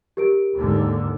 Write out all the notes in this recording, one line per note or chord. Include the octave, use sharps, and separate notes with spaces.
G4 A#4 D7
D#2 G#2 D3